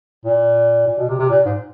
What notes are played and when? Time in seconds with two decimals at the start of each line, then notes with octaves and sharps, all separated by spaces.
0.25 A#2
0.88 A#2
0.99 B2
1.09 C3
1.19 C3
1.30 A#2
1.46 G#2